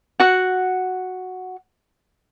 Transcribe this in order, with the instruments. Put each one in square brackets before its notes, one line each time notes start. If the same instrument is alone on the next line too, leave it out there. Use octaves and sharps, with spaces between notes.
[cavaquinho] F#4 F#5